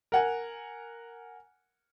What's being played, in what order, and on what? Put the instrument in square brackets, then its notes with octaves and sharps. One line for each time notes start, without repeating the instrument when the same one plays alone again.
[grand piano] A#4 F#5 G#5